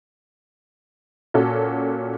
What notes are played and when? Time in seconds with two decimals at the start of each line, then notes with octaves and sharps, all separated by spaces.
1.34 A#2 C#4 F#4 A4